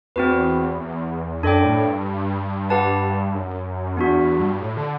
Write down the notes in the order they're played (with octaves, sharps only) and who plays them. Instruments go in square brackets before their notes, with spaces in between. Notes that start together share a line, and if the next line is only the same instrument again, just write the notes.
[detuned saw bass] E2 [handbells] C4 F#4 B4
[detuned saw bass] E2
[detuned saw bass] F#2 [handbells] D4 A4 D5 G5
[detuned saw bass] A2
G2
[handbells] G4 B4 F#5 A5
[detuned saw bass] F#2
[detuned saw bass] E2 [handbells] B3 D4 F#4
[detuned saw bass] E2
G2
A2
D3